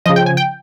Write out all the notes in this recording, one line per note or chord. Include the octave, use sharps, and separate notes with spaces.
C#3 F3 D#5
G5
G#5
G5